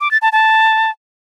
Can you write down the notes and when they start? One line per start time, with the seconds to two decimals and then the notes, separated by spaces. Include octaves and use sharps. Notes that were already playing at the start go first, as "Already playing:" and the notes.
0.01 D6
0.11 A6
0.22 A5
0.32 A5